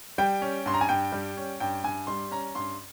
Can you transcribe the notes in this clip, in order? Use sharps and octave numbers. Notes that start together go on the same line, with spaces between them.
G3 G5
C#4
G2 C6
A#5
G#5
G2 G5
G3
C#4
G2 G5
G2 G#5
G3 C6
C#4 A#5
G2 C6